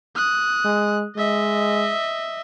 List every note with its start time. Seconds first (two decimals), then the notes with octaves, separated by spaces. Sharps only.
0.16 D#6 F#6
0.65 G#3
1.16 G#3 D#5 E5